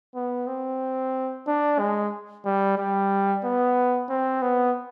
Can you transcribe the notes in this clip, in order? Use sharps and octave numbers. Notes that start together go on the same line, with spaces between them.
B3
C4
D4
G#3
G3
G3
B3
C4
B3